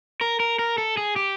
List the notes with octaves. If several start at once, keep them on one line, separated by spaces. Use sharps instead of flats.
A#4
A#4
A#4
A4
G#4
G4